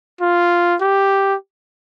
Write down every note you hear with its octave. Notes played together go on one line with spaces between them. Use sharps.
F4
G4